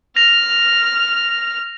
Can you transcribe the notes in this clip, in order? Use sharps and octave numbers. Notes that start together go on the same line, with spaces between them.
F6 A#6 F7